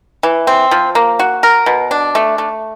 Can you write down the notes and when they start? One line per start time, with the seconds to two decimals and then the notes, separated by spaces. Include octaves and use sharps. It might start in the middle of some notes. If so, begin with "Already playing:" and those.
0.23 E3
0.47 C4
0.71 F3
0.95 A#3
1.19 F#4
1.43 A#4
1.66 B2
1.91 D4
2.15 A3
2.38 A3